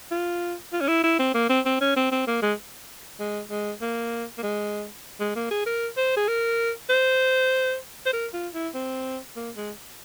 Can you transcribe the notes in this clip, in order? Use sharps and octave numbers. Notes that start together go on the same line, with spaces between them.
F4
F4
C#4
E4
E4
C4
A#3
C4
C4
C#4
C4
C4
A#3
G#3
G#3
G#3
A#3
A#3
G#3
G#3
A#3
G#4
A#4
C5
G#4
A#4
C5
C5
A#4
F4
E4
C4
A#3
G#3